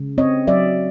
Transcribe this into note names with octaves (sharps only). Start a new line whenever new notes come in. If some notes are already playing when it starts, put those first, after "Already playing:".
Already playing: C#3
C4 C#5 D#5
F#3 D5 E5